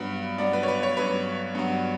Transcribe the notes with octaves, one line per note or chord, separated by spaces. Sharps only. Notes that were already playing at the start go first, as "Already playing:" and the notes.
Already playing: G2 F#3 B3 B5
G2 F#3 B3 D5
B4
C#5
B4
C#5
G2 F#3 B3 B4
G2 F#3 B3